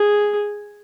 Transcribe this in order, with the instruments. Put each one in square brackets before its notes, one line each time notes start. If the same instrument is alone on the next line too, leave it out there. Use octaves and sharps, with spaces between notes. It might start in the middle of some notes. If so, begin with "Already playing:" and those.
Already playing: [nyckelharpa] G#4